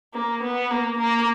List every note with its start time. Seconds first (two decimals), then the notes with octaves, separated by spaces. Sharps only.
0.14 A#3
0.43 B3
0.71 A#3
0.98 A#3